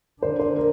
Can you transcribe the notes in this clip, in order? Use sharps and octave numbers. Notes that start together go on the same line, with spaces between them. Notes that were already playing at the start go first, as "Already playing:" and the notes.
D3 C5
C5
A#4